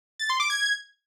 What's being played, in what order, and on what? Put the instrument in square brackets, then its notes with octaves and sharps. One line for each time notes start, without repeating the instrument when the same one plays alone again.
[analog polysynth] A6
C6
D6
G#6